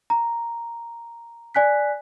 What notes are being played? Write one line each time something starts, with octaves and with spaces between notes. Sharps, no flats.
A#5
D5 G#5 F#6 B6